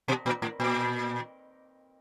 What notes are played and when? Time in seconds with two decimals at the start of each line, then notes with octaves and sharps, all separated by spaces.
0.08 B2
0.26 A#2
0.42 A2
0.60 A#2